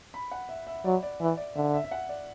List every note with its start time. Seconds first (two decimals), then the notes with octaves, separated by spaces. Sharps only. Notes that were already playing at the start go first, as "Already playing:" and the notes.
0.14 B5
0.31 F#5
0.49 E5
0.67 E5
0.85 F#3 D5
1.03 D5
1.20 E3 E5
1.37 D5
1.55 D3 E5
1.74 E5
1.84 E5
1.91 F#5
2.09 D5